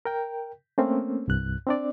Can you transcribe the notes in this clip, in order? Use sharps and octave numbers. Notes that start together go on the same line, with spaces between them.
A#4 G5
A3 A#3 C4 C#4
C2 G2 F#6
C4 D4 D5